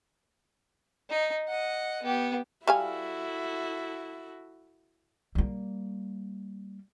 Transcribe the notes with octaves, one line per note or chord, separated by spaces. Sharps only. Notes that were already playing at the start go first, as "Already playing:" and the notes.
D#4
D#5 F#5
B3 G4
G3 E4 F#4 A4 F5 G#5
G3 A#3